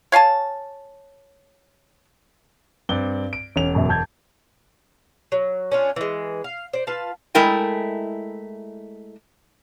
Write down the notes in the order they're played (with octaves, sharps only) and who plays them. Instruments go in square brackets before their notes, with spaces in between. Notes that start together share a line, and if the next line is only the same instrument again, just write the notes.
[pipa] C#5 F5 G#5 A5
[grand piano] G2 C4 D5 [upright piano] G7
[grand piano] D7
[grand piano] E1 F7 [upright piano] C#4
[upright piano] F#2 B2 E5
A5 G6 G#6
[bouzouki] F#3
C#4 D4 F4
E3 G#3
F5
C5 D5
F4 B4 F5 A5
[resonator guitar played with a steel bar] G#3 A3 E4 A#4 G5 G#5